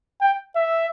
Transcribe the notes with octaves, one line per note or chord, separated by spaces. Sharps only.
G5
E5